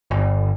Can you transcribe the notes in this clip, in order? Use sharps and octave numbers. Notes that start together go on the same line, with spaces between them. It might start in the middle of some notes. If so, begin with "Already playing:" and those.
G1